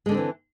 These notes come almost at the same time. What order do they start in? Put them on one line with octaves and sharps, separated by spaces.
G#3 D3 D4 C4 E3